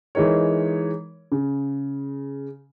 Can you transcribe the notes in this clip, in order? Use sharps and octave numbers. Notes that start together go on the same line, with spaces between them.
E3 G#3 D#4 A#4 C#5
C#3